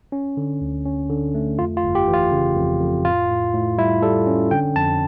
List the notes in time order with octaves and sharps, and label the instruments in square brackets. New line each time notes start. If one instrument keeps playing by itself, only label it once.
[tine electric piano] C#4
D3
D2
C#4
D3
A3
F2 F4
F4
G1
G4
E3
F4
C#3
F2
F2
A2 F4
A2
A2
G3 E4
G3 A4
C#4
D3 G5
F2 A5